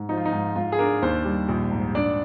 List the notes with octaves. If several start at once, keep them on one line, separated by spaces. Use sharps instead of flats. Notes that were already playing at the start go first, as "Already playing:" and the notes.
Already playing: G#2
F3 D#4
F4
D#4
G#2
G#2 F4
G#4
D4 A#4
D#2 C5
G3
A#1
G#2
D4 D5